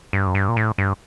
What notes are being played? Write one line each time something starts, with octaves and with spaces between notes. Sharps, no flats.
G2
F#2
G2
A#2
A2
G2